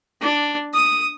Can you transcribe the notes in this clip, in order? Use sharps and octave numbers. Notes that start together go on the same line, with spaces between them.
D4
D#6